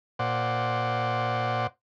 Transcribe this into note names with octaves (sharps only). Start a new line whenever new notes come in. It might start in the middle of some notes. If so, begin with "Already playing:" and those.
A#2 C5 D5 F#5